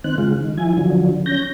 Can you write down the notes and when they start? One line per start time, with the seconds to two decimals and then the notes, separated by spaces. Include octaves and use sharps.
0.04 D#3 C4 F#6
0.18 C#3 G#3 F4
0.40 D#3
0.58 F3 E4 G#5
0.77 D3 F3 F#3
1.26 C#4 G6 A#6